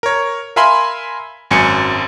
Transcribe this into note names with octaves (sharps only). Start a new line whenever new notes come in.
A#4 C#5
A#4 E5 F5 G#5 B5 C6
G#1 F#2 G#5 C#7